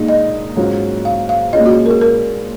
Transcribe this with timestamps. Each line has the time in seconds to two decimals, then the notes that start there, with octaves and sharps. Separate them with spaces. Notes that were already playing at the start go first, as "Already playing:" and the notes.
Already playing: A#2 G#3 D#4
0.08 D#5
0.56 G#2 F#3 C#4 F4
1.05 F5
1.29 F5
1.53 A#2 G#3 C#4 F4 D#5
1.66 F#4
1.86 A#4
1.90 G#4
2.01 A#4